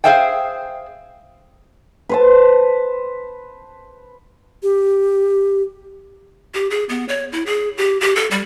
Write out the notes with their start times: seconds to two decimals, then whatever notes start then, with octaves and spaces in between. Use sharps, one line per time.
0.04 G#4 A4 C5 E5 F5 G5
2.09 B4 C5 A5
4.63 G4
6.55 G4
6.70 G#4
6.89 B3
7.09 C#5
7.32 E4
7.46 G#4
7.78 G4
8.01 G4
8.16 A4
8.31 G3